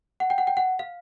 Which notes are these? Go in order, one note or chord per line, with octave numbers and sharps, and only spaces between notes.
F#5
G5
F#5
G5
F#5
F5